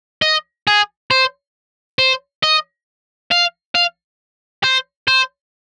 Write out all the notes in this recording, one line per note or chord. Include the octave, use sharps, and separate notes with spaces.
D#5
G#4
C5
C5
D#5
F5
F5
C5
C5